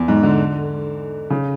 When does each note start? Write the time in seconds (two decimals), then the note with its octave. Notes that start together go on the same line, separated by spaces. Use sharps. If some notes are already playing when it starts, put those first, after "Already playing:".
Already playing: E2
0.08 G#2
0.23 D3
1.30 C#3